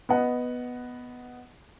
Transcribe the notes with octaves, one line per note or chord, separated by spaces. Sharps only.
B3 D#5 F#5